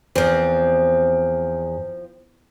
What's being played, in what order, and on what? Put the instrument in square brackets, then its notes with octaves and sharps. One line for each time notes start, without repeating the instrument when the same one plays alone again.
[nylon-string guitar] E2 [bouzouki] F3 C4